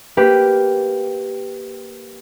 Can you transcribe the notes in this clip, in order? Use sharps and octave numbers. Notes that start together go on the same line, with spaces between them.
A#3 G4 B4